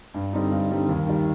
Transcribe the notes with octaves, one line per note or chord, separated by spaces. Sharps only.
G2
D3 G3 C4 D#4
G2
D3 G3 C4 D#4
D#2
D#3 G3